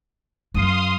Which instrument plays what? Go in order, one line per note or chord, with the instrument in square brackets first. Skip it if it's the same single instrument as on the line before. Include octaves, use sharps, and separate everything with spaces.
[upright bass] F#2 [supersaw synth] F5 C6 D#6